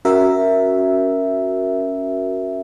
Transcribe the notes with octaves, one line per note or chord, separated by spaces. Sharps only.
C#4 F#4 A#4 E5